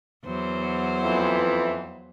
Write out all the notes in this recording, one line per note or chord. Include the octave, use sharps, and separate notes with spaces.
E2 F#3 C5
F2 E3